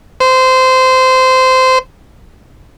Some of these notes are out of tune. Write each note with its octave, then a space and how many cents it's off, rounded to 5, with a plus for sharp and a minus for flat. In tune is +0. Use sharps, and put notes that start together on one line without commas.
C5 -20